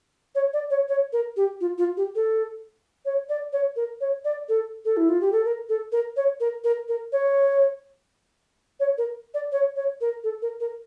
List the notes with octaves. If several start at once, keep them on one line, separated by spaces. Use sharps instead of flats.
C#5
D5
C#5
C#5
A#4
G4
F4
F4
G4
A4
C#5
D5
C#5
A#4
C#5
D5
A4
A4
E4
F4
G4
A4
A#4
A4
A#4
C#5
A#4
A#4
A#4
C#5
C#5
A#4
D5
C#5
C#5
A#4
A4
A#4
A#4